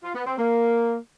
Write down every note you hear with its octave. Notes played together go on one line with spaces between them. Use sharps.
F4
B3
C4
A#3